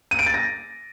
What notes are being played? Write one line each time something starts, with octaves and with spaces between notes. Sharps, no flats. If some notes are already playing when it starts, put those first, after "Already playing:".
D#7
D7
A6
A#6